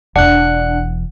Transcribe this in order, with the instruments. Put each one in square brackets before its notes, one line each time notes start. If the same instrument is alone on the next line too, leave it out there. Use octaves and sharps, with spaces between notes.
[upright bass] E1 E2 [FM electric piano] D4 [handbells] F#5 F#6